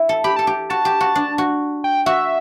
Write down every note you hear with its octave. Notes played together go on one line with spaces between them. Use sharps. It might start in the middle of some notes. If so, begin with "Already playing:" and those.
Already playing: E4
A4
G4 B5
A4 A5
G4
F#4 A5
G4
F#4
D4
F#4
G5
F#4 E5